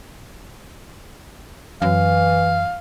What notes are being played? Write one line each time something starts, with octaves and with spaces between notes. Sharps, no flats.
F#2 E3 F5